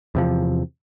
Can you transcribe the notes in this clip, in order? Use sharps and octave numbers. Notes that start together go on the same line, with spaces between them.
E2 C3 F3